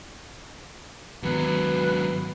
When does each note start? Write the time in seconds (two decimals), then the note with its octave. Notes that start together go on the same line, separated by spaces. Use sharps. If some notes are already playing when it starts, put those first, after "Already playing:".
1.23 G#2 D#3 F#3 B3 B4